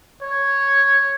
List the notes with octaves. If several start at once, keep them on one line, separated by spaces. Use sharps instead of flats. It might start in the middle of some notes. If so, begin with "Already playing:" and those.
C#5